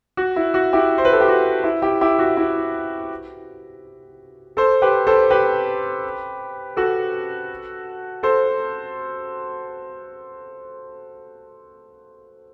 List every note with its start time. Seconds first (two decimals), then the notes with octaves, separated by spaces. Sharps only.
0.17 F#4
0.36 E4
0.54 F#4
0.73 E4 G4
0.98 C5
1.05 B4
1.13 A4
1.21 G4
1.28 F#4
1.64 E4
1.82 E4 G4
2.01 E4 G4
2.19 F#4
2.37 E4
4.57 A4 C5
4.82 G4 B4
5.07 A4 C5
5.30 G4 B4
6.76 F#4 A4
8.23 A4 C5